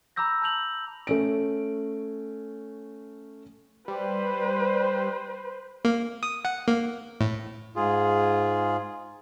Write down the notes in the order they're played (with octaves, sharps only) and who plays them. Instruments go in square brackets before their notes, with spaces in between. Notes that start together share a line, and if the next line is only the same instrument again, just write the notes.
[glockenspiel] A#5 B5 D6 E6 G6 A#6
A5 F6 G6 F7 F#7
[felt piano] A3 C#4 D7
[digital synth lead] G3 [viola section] B4 C5
[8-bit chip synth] A#3
D#6
F#5
A#3
A2
[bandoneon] G#2 F4 G#4